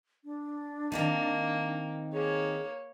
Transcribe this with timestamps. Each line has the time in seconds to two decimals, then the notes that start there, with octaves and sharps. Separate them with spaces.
0.25 D4
0.92 D#3 A#3 C4 D#4
2.13 A#3 G#4 C#5